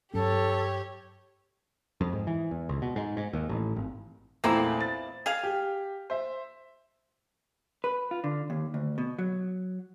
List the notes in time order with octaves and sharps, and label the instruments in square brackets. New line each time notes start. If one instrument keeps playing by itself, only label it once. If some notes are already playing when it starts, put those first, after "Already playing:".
[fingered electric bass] G2 F#3 C#4 [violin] G4 C#5 [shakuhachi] A4
[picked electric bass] F2
G#2
E3
E2
C#2
B2
G#2
G#2
D#2
A1
G#1
[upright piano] A#1 E2 A3 [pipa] A#3 C4 E4
[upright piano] A6
[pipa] G#4 F5
[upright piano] G4
C5 E5
[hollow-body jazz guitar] B4
F4
D3
D#2
D2
B2
F#3